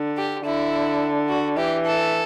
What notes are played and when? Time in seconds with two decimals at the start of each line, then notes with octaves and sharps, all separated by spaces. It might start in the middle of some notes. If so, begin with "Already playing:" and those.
Already playing: D3
0.17 G4
0.45 D3 E4
1.29 F#4
1.57 E3 G4
1.85 A4